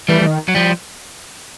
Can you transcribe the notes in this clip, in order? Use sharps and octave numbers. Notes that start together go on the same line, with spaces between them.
E3 G3 A3
E3
D#3
F#3
F3 G3